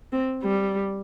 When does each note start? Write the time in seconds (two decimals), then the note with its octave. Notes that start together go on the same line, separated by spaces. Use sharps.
0.12 C4
0.43 G3